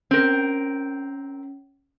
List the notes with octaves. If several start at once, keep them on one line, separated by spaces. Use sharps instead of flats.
C4 C#4 A#4